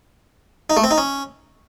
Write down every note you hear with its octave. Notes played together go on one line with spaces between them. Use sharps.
D#4
A3
C4
D#4
C#4